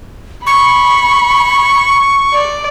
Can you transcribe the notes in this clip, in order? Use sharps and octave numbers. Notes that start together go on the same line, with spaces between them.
B5 C#6
D5